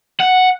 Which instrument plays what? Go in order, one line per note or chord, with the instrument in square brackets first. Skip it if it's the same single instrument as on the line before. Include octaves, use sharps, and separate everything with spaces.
[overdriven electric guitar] F#5